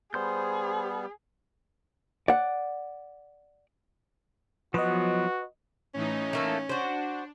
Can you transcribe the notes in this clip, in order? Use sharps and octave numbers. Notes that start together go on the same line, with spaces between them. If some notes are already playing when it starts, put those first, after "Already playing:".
G3 B3 G#4 C5 C6 G6
D5 F#5
F3 F#3 B3 F#4 B4 D#5
A2 E3 C#4 D#4
A3 A#3 A4
D4 F#4 C5